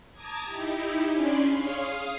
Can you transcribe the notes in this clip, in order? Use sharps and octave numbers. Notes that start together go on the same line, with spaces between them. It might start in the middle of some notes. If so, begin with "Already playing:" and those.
A5 A#5 D6 D#6 G#6
D#4 E4 G4
C#4 D4 D5 G#5 B5 C6
G#4 C#5 F5 C6
F5 D#6